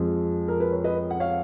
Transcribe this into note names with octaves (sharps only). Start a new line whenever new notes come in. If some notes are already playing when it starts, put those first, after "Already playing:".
Already playing: F2 F3 G#3
A#4
B4
C#5
B4 D#5
F#5
C#5 F5